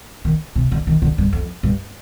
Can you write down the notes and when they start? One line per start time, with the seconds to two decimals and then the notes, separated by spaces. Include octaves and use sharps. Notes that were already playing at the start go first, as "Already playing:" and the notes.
0.25 D#3
0.56 C3
0.72 D3
0.87 D#3
1.02 D3
1.18 G2
1.33 F2
1.63 G2